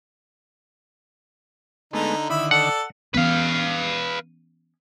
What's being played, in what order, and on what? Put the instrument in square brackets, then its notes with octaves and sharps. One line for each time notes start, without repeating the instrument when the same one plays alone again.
[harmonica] D3 D#4 [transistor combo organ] G#3 A3 B3
[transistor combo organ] D3 D#3 [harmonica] E4 E5 B5
[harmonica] A4 D5 [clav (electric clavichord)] F#5
[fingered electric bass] E3 B3 C#4 [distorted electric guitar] B4 F5